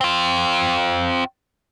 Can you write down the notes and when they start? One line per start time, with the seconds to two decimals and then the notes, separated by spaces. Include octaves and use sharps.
0.01 C4 F4